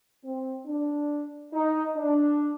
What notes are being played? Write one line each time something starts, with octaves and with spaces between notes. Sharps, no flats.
C4
D4
D#4
D4